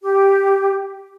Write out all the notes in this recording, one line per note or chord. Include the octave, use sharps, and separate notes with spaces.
G4